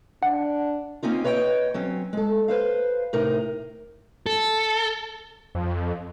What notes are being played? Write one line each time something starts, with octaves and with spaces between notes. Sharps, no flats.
D4 F#5
A#3 C4 C#4 D#4 F4
B4 C#5 D#5 F5 G5
F#3 C4 C#4
G#3 A4
B4 C5 F5
A2 C3 D#4 A#4
A4
F2